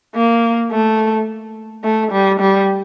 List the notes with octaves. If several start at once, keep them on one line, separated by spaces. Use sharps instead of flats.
A#3
A3
A3
G3
G3